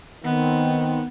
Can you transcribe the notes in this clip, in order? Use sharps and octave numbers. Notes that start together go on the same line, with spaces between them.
D#3 B3 C4